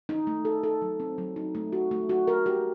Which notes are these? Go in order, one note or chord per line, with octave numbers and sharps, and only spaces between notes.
D#4
A3
A4
A4
F#3
C4
F#3
D#4
A3
F#4
A3
F#4
A#4
G4